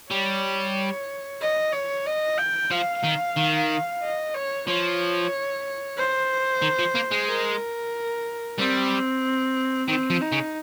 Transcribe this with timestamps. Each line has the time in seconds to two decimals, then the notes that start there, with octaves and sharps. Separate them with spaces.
0.10 G3 C#5
1.41 D#5
1.73 C#5
2.06 D#5
2.38 G5
2.71 F3 F5
3.04 D#3
3.37 D#3
4.02 D#5
4.34 C#5
4.67 F3 C#5
5.97 C5
6.62 D#3
6.79 F3
6.95 A#3
7.11 G#3
7.28 A#4
8.58 G3 C4
9.88 D#3 C4
10.10 F3
10.21 D#4
10.32 C#3